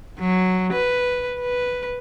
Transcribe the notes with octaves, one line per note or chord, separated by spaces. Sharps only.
F#3
B4
B4